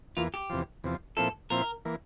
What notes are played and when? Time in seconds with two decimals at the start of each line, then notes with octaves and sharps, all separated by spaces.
0.17 E2 E3 A#3 F4
0.34 G4
0.50 E2 C3 F3
0.84 E2 C3 F3
1.17 A#2 F3 C4 E4 A4
1.50 A#2 F3 C4 E4 A#4
1.85 E3 A#3